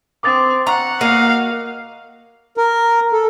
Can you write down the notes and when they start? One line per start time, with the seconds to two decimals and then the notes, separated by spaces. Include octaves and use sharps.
0.23 C4 D6 D#6 A6
0.67 F#5 A#5 C#6
1.01 A#3 F#4 D#5 F5
2.57 A#4
3.13 A4